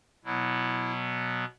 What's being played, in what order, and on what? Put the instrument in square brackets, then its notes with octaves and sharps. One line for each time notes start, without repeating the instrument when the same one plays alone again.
[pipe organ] B2 F#3 B3 E4